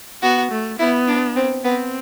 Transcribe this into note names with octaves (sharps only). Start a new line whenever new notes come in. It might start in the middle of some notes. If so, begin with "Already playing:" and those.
B3 F#4
A3
B3 E4
D4
C4
B3 C4